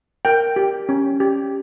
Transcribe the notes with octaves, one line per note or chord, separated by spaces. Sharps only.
A#4 G5
G4
C#4
G4